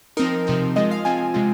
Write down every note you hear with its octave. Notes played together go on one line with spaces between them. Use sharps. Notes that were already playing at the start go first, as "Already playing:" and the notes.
F3 C4 D#4 A#4
C3 F3 C4 D#4
F3 G#3 F4 D#5
F5
F3 C4 F4 G#5
C3 G#3 C4 F4